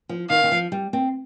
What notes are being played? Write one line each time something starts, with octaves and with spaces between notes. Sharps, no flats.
F3
D#3 F5
D#3
F3
G3
C4